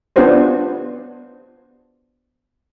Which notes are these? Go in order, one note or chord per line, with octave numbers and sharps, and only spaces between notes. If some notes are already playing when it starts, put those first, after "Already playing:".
B3 D4 F4 G4 C5 C#5